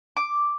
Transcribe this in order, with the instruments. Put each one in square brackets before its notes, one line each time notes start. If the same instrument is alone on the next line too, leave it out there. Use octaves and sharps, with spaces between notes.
[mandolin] D6